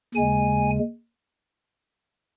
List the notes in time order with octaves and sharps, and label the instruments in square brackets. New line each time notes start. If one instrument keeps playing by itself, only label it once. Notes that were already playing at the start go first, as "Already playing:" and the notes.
[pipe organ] D#2 C#3 G#3 G#5